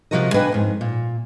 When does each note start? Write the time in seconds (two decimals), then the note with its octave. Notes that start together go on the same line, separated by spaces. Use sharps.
0.11 C3 E3 F3 F#4 A#4 D#5
0.34 A#3 D4 B4 D#5 G5 G#5
0.52 F2 G#2
0.81 A#2